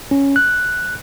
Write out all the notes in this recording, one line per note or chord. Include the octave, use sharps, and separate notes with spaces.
C#4
F#6